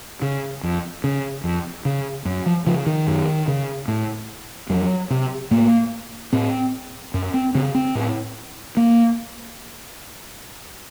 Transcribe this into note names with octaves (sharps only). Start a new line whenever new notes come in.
C#3
F2
C#3
F2
C#3
F#2
F3
C#3 F3
D#3
F#2
C#3
A2
F2 F#3
C3
A2 A#3
A2 C4
F#2
C4
C#3 C4
C4
A2
A#3